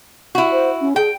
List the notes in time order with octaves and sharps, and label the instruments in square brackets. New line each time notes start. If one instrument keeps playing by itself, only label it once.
[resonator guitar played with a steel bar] E4 F#4
[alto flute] C5
C#4
[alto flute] G#4 [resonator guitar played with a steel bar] G5